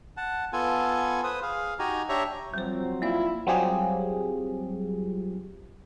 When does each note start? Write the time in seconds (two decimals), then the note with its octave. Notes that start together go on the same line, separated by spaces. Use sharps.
0.17 F#5 A5
0.53 B3 F4 A4 G#5
1.24 B4 C5 D#6
1.42 G#4 F5
1.79 D#4 F#4 G4 G#5 A#5
2.09 D4 G4 C#5 E5 A#5
2.54 F2 F#3 G3 C4 C5
3.02 A#3 E4 F4 D5 F5
3.47 F#3 G3 C4 F4 G4 G#4